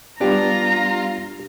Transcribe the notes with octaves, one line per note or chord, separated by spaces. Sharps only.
G3 B3 D4 F4 G4 A#5